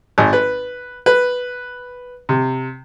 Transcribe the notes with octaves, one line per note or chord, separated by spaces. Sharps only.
G#1
B4
B4
C3